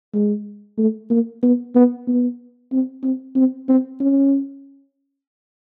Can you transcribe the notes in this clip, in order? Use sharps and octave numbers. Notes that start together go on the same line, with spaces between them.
G#3
A3
A#3
B3
B3
B3
C4
C4
C4
C4
C#4